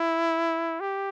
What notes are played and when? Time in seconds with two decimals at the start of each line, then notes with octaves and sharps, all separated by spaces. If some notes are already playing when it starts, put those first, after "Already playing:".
Already playing: E4
0.81 G4